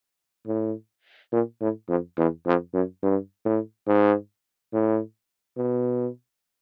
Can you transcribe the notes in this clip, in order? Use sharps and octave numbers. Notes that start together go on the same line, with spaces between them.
A2
A#2
A2
F2
E2
F2
F#2
G2
A2
G#2
A2
B2